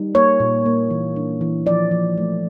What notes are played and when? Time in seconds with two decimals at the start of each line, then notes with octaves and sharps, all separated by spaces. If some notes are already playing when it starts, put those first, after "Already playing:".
Already playing: G3 D#4
0.14 A#3 C#5
0.40 A#2
0.66 A#3
0.90 E3
1.16 D4
1.41 E3
1.66 F3 D5
1.91 F3
2.18 A3